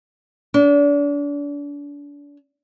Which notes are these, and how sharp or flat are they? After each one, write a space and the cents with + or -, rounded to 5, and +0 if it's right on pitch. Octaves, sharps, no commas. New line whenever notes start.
D4 -35